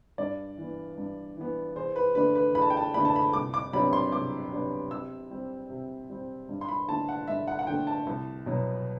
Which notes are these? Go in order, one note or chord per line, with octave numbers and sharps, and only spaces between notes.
G2 D5
E3 B3
G2
E3 B3
E2 C5
B4
D3 A3 D4 B4
B4
E2 B5
A5
G5
A5
D3 A3 D4 B5
A5
B5
C2 D6
D6
C3 F#3 B3 D4 B5
C6
C2 D6
C3 F#3 B3 D4
C3 E6
G3 C4
C3
G3 C4
G2
C6
B5
D3 A3 A5
F#5
G2 E5
F#5
F#5
D3 A3 G5
A5
C2
B2 F#3